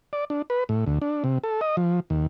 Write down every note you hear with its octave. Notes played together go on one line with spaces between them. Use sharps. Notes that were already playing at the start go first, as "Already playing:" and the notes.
D5
D4
B4
A2
D2
D4
C3
A4
D#5
F3
D#2